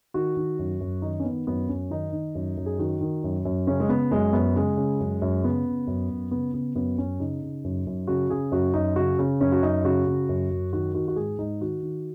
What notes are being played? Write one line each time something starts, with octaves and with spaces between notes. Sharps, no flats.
D#3 F#4
D#3
F#2
F#2
D#3 D#4
C#4
D#3 B3
F#2 B3
F#2 C#4
D#3 D#4
D#3
F#2
F#2
G#4
D#3 F#4
D#3
F#2
F#2
C#3 C#4
G#3
C#3 B3
F#2 G#3
F#2 B3
C#3 G#3
C#3
F#2
F#2
C#3 B3
C#3
F#2
F#2
C#3 B3
C#3 B3
F#2 B3
F#2 C#4
C#3 D#4
C#3
F#2
F#2
C#3 F#4
C#3 G#4
F#2 F#4
F#2 D#4
C#3 F#4
C#3
F#2 C#4
F#4
F#2 D#4
C#3 F#4
C#3
F#2
F#2
D#3 F#4
D#3 F#4
F#4
G#2 G#4
G#2 D#4
D#3 F#4
D#3